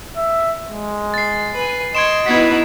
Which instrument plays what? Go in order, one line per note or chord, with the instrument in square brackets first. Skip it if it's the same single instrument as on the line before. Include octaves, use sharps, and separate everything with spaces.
[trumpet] E5
G#3
[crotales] A6 C7
[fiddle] B4 G#5
[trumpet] D#5 [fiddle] C6 C#6 [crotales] G#6 D7 E7
[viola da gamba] B3 D#4 E4 [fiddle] F#4 B4 [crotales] G#6 B6